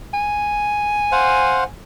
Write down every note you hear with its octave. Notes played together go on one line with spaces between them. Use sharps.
G#5
C5 F5 F#5